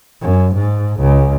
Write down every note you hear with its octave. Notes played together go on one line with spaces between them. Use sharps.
F#2
G#2
C#2